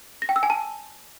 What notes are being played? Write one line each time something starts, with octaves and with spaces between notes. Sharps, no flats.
A#6
G5
E6
G#5
A5